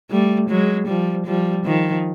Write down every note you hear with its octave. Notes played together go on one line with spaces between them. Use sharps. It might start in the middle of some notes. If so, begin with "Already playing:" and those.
G3 A3
F#3 G#3
F3 G3
F3 G3
D#3 F3